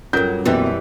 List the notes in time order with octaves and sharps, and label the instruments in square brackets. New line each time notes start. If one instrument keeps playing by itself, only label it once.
[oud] G2 F#3 [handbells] C#4 F4 A4 [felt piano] A#4 G6
[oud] F#2 E3 G3 [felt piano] B2 A#3 C4 [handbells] G4 B4